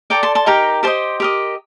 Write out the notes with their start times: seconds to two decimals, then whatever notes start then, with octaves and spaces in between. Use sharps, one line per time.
0.10 A4 D5 G5 A#5
0.23 A5 C6
0.35 A5 C6
0.46 D#4 G4 A#4 G5 A#5
0.83 G4 C5 D#5 A5 C6
1.20 G4 A#4 D#5